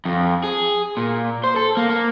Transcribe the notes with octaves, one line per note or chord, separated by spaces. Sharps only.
F2
G#4
A#2
C5
A4
A#3
A#3